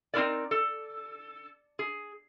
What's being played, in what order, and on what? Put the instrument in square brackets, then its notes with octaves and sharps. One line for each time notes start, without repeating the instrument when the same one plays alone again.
[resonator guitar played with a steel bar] C4 D#4 E4 A4 A#4 D5
A4
G#4